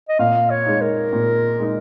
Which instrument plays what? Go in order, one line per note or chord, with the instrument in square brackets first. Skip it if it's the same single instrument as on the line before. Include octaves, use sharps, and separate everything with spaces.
[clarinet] D#5
[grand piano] A#2 [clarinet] F5
[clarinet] C#5
[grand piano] G#3 D#4
[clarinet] A#4
[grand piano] A#2
G#3 D#4